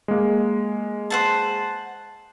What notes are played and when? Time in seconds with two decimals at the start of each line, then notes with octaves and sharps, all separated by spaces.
0.08 G#3 A#3
1.10 C5 F#5 A5